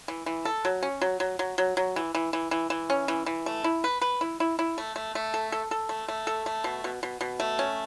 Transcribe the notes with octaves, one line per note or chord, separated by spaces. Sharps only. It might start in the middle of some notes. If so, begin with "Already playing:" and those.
E3
E3
A4
F#3
C#4
F#3
F#3
F#3
F#3
F#3
E3
E3
E3
E3
E3
C#4
E3
E3
A3
E4
B4
B4
E4
E4
E4
A3
A3
A3
A4
A4
A4
A3
A3
A4
A3
B2
B2
B2
B2
A3
C#4